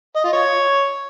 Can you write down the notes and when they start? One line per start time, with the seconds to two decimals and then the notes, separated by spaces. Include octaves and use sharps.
0.16 D#5
0.24 F4
0.33 C#5